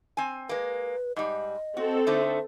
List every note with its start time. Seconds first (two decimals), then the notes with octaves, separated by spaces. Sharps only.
0.17 C4 G#5
0.49 G#3 A#3 B4
1.16 G#2 G3 D#5
1.77 C4 F#4 A4
2.07 D3 A3 D#4 C5